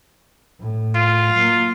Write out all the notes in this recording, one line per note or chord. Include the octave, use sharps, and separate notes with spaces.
A2
F4
F#3 A#3